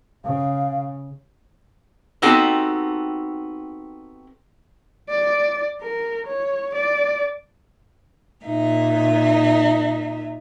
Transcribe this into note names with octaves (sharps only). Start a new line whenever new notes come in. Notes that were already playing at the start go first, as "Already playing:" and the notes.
C#3 F5
B3 C4 D#4 F#4 G4 A4
D5
A#4
C#5
D5
A#2 D#4 E5